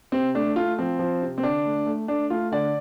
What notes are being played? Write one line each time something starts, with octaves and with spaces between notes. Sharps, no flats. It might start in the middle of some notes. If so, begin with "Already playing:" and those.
C3 C4
A3 D4
A3 F4
F3 C4
F3
C3
C4
D3 D4
A3
A3
A3 D4
A3 F4
D3 D5